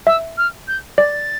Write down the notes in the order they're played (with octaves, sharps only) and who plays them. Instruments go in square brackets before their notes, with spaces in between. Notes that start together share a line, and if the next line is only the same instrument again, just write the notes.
[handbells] E5 [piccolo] E6
[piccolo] F6
G6
[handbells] D5 [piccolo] A6